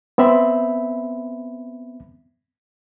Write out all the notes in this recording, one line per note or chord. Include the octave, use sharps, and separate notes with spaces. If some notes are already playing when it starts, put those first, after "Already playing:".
B3 C4 E5 B5